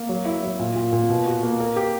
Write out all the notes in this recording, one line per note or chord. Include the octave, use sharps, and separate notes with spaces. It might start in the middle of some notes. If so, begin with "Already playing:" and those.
Already playing: A#3
F#3
E4
F#3
A#2
A#2
A#2
B2
F#4
A#3
A#4
G4